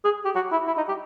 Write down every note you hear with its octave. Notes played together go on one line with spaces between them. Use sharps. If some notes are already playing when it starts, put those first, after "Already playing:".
G#4
G4
F#4
E4
E4
D#4
G4